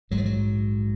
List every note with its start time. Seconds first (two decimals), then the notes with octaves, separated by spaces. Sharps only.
0.11 A#1 G#2 F#3
0.18 F3
0.25 F#3